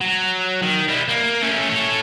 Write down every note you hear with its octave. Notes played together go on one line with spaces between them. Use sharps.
F#3
D#3
G3 E4
A#3
A3 C#4
A4 C#5